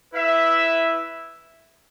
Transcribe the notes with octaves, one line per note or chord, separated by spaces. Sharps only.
E4 B4 E5